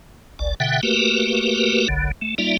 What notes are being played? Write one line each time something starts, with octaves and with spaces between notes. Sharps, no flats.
G1 C#2 D5
B2 D3 E5 F#5 G5
A3 A#3 F#4 G4 A#4 B4
F#1 B1 D3
A3
G3 A#3 D#4 F4 D5 E5